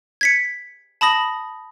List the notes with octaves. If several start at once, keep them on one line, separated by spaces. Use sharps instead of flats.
G#6 B6 C#7
A5 B5 D#6 A#6 F#7